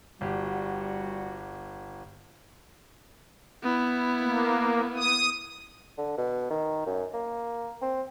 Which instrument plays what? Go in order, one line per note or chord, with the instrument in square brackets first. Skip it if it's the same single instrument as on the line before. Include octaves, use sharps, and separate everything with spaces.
[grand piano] G1 G4 [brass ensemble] G3 F#4
[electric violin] B3 E4
[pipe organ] A#3
D#6
[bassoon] D3
B2
D#3
F#2
A#3
C4